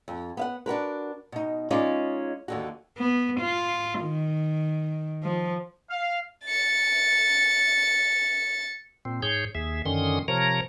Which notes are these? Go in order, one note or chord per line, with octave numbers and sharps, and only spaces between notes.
F2
B3 F5 F#5
D4 F#4 A#4 B4
B2 D#4
G#3 C#4 D#4 F4 D5
D#2 D3 F#4
B3
F4
D#3
F3
F5
A6 C#7
A#2 C4
G#2 G#4 C#5 G6
D#2 G#4 E5
F#2 D3 D#3 C#4 C6 D#6
C3 F3 A#4 C#5 A#5